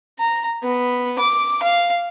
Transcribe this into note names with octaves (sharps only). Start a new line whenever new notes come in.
A#5
B3
D6
F5